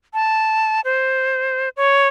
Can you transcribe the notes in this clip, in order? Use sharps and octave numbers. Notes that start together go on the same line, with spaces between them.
A5
C5
C#5